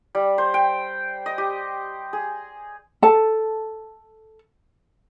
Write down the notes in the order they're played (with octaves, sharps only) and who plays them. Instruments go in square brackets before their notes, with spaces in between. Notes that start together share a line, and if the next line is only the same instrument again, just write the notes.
[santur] G3
C5
G5
D#5
G4
G#4
[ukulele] A4 A5